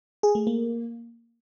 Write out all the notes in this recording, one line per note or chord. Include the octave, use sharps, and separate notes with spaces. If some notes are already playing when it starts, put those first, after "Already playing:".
G#4
A3
A#3